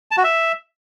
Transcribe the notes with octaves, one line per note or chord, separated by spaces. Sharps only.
A5
F#4
E5